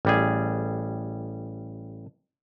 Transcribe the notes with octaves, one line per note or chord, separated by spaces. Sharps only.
A1 G3 G#4